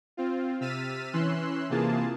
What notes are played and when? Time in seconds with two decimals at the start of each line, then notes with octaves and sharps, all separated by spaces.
0.17 C4 F4
0.61 C3 E6 F6 A6 B6 D#7
1.13 E3 C#4 C6 E6 F#6
1.70 C3 E3 A#3 F4 G#4 A5